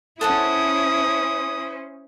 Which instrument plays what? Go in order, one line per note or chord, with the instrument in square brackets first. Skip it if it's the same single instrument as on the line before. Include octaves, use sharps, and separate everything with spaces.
[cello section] C#4 C5 [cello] E4 [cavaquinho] A4 F#5 A5 [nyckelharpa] D#6